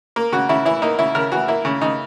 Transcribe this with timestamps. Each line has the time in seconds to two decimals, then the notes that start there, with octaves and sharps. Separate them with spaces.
0.16 A#3
0.32 C#3 F#4
0.49 C#3 E4
0.65 E3 E4
0.82 A#3 D#4
0.99 C#3 E4
1.15 C#3 A#4
1.32 E3 F#4
1.48 A#3 E4
1.65 C#3
1.81 C#3 D#4